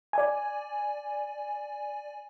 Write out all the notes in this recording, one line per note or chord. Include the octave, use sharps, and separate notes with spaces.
D5 G#5